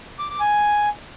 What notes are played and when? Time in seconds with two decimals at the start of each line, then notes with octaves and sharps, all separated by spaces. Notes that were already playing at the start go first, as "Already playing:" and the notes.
0.19 D6
0.29 D6
0.40 G#5